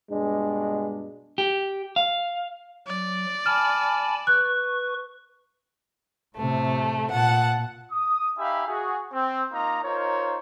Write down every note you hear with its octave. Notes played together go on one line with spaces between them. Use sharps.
G2 B2 G#3 D4
G4
F5
F#3 D5
G#5 A5 B5 F6
B4 C#6 F#6
A2 C3 A3
A#2 F#5 A5
D#6
D#4 G4 E5 F5 G#5 B5
F#4 G#4
C4
A#3 D#4 F4 A#5
D#4 F4 A#4 C5 C#5